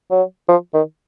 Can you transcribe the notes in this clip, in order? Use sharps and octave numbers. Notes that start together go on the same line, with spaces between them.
F#3
F3
D#3